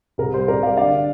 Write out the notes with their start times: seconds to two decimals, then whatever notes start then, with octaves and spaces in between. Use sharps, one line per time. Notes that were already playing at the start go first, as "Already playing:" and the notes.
0.18 C2 A#4
0.34 G3 C5
0.48 C2 A#4 D5
0.62 G3 D5 F5
0.77 D3 D5 F5
0.91 D4